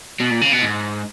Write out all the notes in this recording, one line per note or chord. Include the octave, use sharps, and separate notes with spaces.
B2
A#2
C#3
B2
G#2